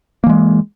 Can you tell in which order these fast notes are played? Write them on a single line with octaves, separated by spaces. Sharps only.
A#3 E3 G#3